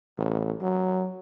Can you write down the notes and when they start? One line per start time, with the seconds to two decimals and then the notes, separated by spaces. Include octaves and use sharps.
0.18 A1
0.61 F#3